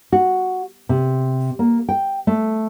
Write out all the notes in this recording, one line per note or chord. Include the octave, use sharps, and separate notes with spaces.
F#4
C3
A#3
G5
A3